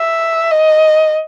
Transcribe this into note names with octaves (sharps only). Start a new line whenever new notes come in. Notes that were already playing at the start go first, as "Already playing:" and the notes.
Already playing: E5
D#5